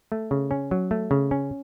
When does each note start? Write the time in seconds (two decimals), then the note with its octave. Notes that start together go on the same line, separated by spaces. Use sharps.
0.12 A3
0.31 C#3
0.51 C#4
0.71 F#3
0.91 A3
1.11 C#3
1.31 C#4